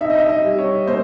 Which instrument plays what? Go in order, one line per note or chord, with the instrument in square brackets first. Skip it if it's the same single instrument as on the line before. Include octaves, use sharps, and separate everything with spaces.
[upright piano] D#4 E5
D#5
E5
D#5
G3
C#5
A#3 C5